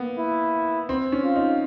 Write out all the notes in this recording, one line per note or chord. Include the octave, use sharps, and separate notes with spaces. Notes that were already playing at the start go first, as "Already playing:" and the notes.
Already playing: A#3 B3
E4
C4
C#4
F4
D#4